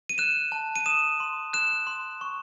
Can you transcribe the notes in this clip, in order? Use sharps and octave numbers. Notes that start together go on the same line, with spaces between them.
D#7
F#6 E7
A5
D#7
D#6 E7
C6
F#6 E7
C6
C#6